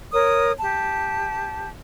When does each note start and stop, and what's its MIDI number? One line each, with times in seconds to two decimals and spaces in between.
0.12 0.51 70
0.12 0.51 73
0.12 0.51 87
0.59 1.69 67
0.59 1.69 81